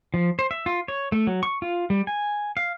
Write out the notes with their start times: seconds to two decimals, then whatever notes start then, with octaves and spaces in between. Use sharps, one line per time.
0.14 F3
0.39 C5
0.51 E5
0.66 F4
0.88 C#5
1.12 A3
1.27 F#3
1.43 C#6
1.62 F4
1.90 G3
2.07 G#5
2.57 F5